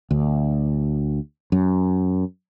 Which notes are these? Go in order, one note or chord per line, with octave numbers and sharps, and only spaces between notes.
D2
F#2